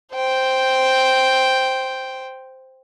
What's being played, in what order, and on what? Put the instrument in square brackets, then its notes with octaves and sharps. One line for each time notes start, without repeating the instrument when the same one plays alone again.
[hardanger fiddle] C5 G5